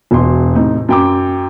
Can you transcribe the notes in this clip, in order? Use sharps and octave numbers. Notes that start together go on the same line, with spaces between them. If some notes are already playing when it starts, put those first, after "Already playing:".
E1 B2 C6
A2 C3 D#4
F#2 G5 D6